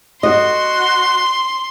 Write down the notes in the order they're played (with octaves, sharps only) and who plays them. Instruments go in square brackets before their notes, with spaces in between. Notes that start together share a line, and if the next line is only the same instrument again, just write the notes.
[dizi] F#4 [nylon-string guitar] D#5 [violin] C6